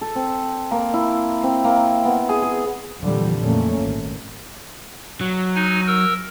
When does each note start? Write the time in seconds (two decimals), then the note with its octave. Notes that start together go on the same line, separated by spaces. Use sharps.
0.01 A4
0.15 C4
0.71 A#3
0.94 E4
1.43 C4
1.64 A#3
2.05 B3
2.29 G#4
2.42 G#4
3.01 F2 A#2 D3 E3 F3 G3
3.38 F2 A#2 F3 A3 A#3 C#4
3.82 G#1
5.21 F#3
5.55 D#4 G#5
5.87 A#4 E6